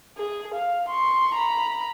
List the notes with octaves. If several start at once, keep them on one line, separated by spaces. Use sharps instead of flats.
G#4
F5
C6 C#6
A#5 B5